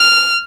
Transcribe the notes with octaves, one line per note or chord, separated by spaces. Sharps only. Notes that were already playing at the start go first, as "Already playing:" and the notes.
Already playing: F6